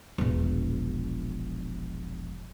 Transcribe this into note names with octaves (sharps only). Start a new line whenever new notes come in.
E1 A#1